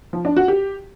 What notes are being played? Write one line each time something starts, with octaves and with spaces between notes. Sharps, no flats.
F3
D4
F#4
G4